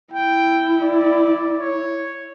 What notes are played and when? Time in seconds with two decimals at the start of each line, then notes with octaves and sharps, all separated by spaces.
0.14 E4 G5
0.82 D5
1.60 C#5